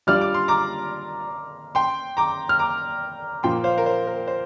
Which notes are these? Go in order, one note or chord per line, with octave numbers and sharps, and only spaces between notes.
G3 D4 F4 D5 F6
D6
C6
A#5 D6
G5 C6
A#5 D6
F6
A#5 D6
A#2 F3 A#3 G5 C6
C5 F5
A#4
C5
A#4
C5